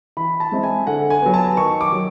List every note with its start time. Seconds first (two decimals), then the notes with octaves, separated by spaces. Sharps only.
0.17 E3 B5
0.40 A5
0.52 G#3 C4 E4
0.63 G#5
0.87 D3 F#5
1.10 G#5
1.22 F#3 B3
1.34 A5
1.57 D#3 C#6
1.81 D6
1.92 F#3